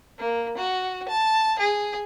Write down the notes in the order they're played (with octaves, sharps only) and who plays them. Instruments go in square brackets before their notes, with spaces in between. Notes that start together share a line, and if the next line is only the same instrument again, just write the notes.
[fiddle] A#3
F#4
A5
G#4